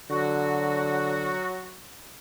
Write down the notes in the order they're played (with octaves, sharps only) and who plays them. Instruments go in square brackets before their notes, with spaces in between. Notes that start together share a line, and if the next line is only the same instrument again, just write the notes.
[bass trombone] D3 [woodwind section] F#3 F#4